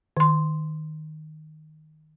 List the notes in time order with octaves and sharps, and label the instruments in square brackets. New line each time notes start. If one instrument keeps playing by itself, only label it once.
[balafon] D#3 C6